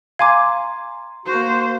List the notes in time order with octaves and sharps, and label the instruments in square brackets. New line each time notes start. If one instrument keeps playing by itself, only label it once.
[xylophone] F5 G#5 D6 [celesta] A#5 C6 G#6
[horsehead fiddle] A#3 C5 [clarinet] F#4